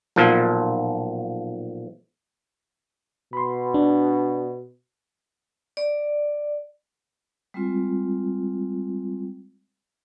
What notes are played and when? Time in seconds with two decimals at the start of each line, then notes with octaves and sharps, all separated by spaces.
0.16 B1 A#2 F3
3.33 B2 B5 C6
3.74 D4
5.77 D5
7.54 G3 G#3 C4 F4